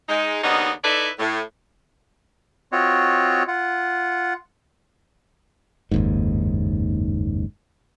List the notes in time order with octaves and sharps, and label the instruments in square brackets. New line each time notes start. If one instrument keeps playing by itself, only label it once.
[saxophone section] G#3 D#4
D#2 C#3 B3 D4 D#4
D#4 E4 A4 B4 D5 E5
A2
[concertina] C4 F4 F#4 C#5 D#5
F4 F#5
[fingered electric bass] F#1 D#2 G#2